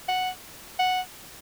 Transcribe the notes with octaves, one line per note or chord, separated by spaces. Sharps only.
F#5
F#5